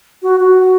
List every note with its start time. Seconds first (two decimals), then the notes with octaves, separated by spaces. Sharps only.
0.23 F#4
0.40 F#4